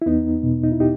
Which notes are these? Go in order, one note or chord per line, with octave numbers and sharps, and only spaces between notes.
E4
E2 B3 D#4
B2
D#4
E4
D#4 G4